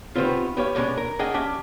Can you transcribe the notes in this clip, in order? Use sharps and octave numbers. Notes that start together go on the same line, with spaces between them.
D#3 G3 B3 C4 F4
B3 G4 C#5 F5
B2 D3 G#3 C#4 D4
A#4
C#4 D4 G#4 D#5 F#5 G5
C#4 D4 G4 E5